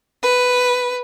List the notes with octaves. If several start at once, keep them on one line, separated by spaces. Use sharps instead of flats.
B4